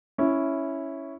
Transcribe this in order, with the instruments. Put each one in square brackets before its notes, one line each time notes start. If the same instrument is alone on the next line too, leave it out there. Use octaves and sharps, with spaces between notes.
[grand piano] C#4 E4